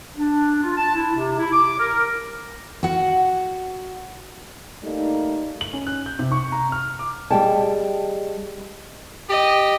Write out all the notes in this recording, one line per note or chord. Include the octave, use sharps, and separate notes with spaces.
D4
F4
A5
E4
C3
E4
D6
A#4
F#4 F#5
G3 A3 A#3 D#4
F#7
C#4
F#6
G6
C3
C#6
A#5
F6
D6
G3 G#4 D5 D#5 G5 A5
G4 D#5